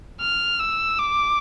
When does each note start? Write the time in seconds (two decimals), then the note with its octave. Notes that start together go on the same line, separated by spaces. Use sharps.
0.21 F6
0.60 E6
0.99 D6